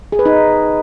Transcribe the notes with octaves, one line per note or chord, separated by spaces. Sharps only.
G#4
B4
D#4